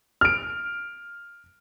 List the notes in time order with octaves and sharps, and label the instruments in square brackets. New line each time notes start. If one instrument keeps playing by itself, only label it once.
[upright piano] F6 D7